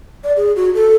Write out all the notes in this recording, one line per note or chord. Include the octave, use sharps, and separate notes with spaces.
D5
G#4
F#4
A4